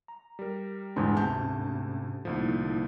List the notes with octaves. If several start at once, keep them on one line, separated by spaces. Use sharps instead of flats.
A#5
G3 A#4
A#1 E2 G#2
D2 G#2 C3 C4 C#4 A5 G6
C2 A2 D3 F3 A#3 D#4 E4